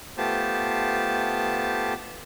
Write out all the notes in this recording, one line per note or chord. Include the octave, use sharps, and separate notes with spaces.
A3 B3 F4 G4 C5 A5